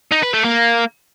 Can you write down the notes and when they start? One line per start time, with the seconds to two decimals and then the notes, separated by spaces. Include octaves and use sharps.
0.12 D#4
0.23 B4
0.34 A3
0.45 A#3